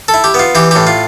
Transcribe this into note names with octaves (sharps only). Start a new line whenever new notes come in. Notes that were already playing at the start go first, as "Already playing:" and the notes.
A4
E4
G4
B3 F4
E3 G4
A2 G4
F4